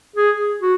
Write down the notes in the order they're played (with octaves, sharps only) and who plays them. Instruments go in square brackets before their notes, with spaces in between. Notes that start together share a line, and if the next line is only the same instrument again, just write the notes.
[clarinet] G#4
F#4